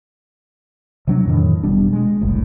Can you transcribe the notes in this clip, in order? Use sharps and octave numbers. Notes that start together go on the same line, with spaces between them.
C3 F#3 D4
F2 A2 D#3 E3
F1 B2 G3 D4
G#3
F#1 C2 A2